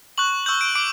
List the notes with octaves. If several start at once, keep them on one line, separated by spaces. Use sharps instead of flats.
C#6 F#6 F#7
C#6 E6 G6 F#7
D7
D6 D7